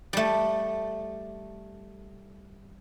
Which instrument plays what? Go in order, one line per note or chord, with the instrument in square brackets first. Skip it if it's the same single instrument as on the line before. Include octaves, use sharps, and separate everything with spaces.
[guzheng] G3 A3